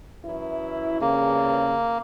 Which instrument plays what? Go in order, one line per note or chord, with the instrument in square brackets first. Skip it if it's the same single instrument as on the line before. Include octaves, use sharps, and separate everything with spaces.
[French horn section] F#2 E3 E4
[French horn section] E2 G2 C#3 [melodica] A#3